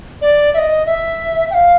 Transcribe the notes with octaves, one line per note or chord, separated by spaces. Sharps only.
D5
E5
D#5
E5
G5
F5